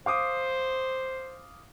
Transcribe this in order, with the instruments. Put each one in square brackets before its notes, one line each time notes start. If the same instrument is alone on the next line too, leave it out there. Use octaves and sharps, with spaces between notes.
[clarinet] C5 [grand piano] F5 D6 D#6